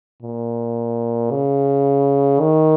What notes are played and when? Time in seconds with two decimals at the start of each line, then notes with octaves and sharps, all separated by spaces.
0.22 A#2
1.31 C#3
2.40 D#3